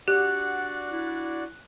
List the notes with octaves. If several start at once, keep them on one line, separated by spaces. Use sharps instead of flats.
D4 F#4 G4 D5 F#5 F#6
E4